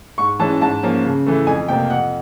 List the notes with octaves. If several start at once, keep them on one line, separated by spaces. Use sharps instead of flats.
G#2 C#6
E3 G#3 C#4 A5
G#2 A5
F3 A#3 C#4
C#3
E3 A3
F2 G#5
C3 F3 A#3 G5
F2 F#5